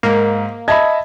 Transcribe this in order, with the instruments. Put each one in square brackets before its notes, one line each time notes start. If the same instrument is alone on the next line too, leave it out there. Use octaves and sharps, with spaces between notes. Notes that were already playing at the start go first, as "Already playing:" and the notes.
[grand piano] G#2 [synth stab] A#3
[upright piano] D#5 E5 B5 [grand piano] A5 G#6